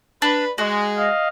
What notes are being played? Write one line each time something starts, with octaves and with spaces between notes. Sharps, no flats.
D4 B4
G#3 F#4
D#5 F5